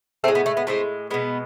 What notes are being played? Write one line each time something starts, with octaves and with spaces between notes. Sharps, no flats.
A2 G#3 A3 C4
B3
A3
B3
A2 G#3 A3 C4
B2 G#3 B3